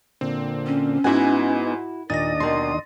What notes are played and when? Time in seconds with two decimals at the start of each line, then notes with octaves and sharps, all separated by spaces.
0.21 A#2 D3 C4
0.66 C#4
1.04 G#2 B3 D#4 E4 F#4 F#5 G#5
2.10 D#2 A#2 D4 D#5 D#6 A6 A#6
2.40 B2 D#3 C6